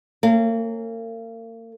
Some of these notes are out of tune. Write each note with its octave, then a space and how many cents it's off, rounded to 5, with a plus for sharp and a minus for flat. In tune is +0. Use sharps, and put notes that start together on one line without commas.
A#3 -40 C#4 -25